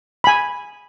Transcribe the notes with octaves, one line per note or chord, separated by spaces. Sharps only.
G#5 B5